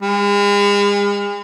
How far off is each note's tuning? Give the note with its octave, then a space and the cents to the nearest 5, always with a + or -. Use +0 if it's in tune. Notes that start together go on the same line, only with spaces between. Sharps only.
G#3 -45